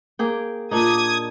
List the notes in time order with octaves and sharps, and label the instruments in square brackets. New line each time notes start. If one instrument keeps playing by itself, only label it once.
[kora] A#3 G#4 G5
[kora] A#2 D4 D#4 [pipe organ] D#6 G#6